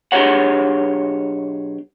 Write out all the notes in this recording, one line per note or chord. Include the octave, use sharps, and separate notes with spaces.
B1 D4 G4 G#4 C#5 F#5